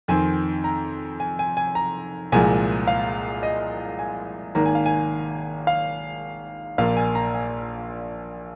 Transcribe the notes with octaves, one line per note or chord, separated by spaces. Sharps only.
F2 D#3 C4 G#5
A#5
G#5
G#5
G#5
A#5
C2 A#2 F3 G#3 G#5
F5
D#5
G#5
G#1 G#2 D#3 A#3 A#5
G#5
F5
G#5
F5
A#1 A#2 A#3 F5
G#5
A#5
G#5